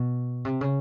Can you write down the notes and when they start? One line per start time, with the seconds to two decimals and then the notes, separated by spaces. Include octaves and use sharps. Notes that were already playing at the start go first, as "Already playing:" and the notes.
Already playing: B2
0.45 C3
0.61 C#3